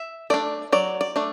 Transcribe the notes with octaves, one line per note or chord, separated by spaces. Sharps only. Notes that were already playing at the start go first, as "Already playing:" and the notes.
Already playing: E5
A3 D4 D5
F#3 D5
D5
A3 D4